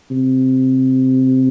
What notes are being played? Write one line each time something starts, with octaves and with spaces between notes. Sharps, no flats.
C3